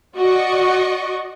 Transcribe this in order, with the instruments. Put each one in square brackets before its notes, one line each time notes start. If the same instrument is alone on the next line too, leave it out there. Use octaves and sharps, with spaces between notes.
[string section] F#4 D5 D#5 C#6